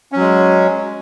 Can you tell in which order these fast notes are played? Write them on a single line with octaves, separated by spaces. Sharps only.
C#4 F#3 G#3